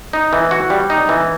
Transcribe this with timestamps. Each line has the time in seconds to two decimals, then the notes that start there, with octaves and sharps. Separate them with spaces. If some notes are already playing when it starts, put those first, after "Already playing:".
0.13 D#4
0.33 E3
0.51 F#4
0.70 G3
0.90 D#4
1.09 E3